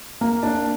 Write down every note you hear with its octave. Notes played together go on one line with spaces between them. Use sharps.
A#3
D4